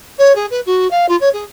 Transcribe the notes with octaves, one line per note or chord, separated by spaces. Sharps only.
C#5
G#4
B4
F#4
F5
F4
C#5
G#4